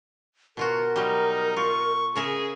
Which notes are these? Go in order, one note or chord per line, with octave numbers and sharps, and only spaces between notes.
B2 F4 F#4 A#4
F#3 G3 D#4
F4 C#6
C#3 G#4 A#4 E5